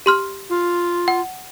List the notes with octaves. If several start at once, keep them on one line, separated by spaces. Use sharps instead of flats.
G4 C6 F6
F4
F#5